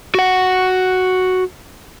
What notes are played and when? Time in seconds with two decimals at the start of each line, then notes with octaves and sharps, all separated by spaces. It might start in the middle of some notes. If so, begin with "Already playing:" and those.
0.15 F#4 F#5